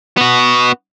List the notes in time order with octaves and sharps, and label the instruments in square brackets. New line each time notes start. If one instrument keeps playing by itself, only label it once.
[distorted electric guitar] B3 F#4